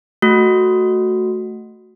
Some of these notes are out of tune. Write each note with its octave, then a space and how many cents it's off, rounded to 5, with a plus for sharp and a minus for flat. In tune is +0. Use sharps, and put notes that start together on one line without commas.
A3 +0 F#4 -5